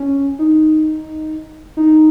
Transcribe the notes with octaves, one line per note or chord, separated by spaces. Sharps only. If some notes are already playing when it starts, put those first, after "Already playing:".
Already playing: C#4
D#4
D#4